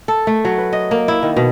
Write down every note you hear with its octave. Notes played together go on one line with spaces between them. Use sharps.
A4
A3
F#3
B4
D#5
A#3
E4
D#3
B2